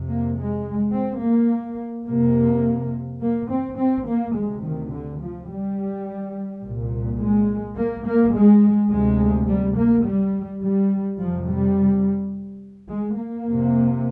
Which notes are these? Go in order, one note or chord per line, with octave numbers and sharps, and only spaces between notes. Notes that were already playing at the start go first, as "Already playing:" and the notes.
Already playing: F2 C3
A#3
G#3
C4
A#3
F2 C3 A#3
A#3
C4
C4
A#3
D2 C3 G#3
D#3
D3
F3
G3
C2 A#2
G#3
A#3
A#3
G#3
D2 C3 G#3
G3
A#3
G3
G3
F2 C3 F3
G3
G#3
A#3
F2 C3